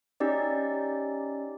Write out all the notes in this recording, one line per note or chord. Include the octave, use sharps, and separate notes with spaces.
C#4 D#4 G4 D5